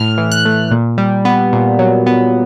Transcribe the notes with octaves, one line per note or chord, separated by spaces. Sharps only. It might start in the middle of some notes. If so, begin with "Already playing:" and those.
Already playing: A2 F6
E3
F#6
A3
A#2
G3
B3
A#2
F#3
B3